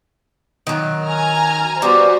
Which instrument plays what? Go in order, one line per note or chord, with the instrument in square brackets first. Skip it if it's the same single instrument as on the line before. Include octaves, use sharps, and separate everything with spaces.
[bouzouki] D#3 F#3
[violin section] G#5 A#5 F6
[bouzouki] G3 B3 C#4 [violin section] F#4 C5